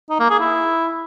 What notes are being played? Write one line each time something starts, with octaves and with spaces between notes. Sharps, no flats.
D#4
A#3
G#4
E4